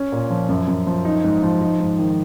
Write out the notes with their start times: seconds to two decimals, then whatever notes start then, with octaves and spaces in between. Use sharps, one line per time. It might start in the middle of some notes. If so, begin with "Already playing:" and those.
Already playing: C#4
0.12 A#2
0.31 F3
0.49 F#2
0.68 F#2
0.87 F3
1.05 D#4
1.24 G#2
1.42 F3
1.61 D#4
1.80 G#2
1.99 D#3